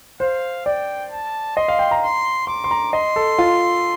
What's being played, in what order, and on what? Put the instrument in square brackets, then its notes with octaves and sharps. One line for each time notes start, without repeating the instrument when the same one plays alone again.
[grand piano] C5 [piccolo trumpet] F5
[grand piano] D5 [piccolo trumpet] G5
[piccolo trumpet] A5
[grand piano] D#5 [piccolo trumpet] C6
[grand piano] F5
G5
A#5
[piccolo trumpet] C6
[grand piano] C6 [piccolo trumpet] D6
[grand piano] C6
A#5
[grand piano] D#5 [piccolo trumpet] C6
[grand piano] A4
F4